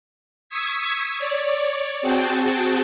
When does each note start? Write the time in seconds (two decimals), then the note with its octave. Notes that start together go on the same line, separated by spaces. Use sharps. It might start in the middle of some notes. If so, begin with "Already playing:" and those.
0.49 C#6 D#6 E6 G#6 B6
1.18 C#5 D5
2.02 C4 F#4 G#4 G5 A5